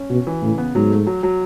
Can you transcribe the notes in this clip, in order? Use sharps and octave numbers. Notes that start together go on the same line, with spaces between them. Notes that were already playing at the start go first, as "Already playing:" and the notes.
Already playing: C#4
B2 F#4
E3
A2 C#3
B3
G#2 F#3
A3
F#3
F#3